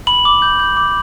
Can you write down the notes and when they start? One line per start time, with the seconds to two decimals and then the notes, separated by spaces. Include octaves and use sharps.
0.07 B5 F#7
0.25 D6
0.42 G6
0.60 G6
0.77 D6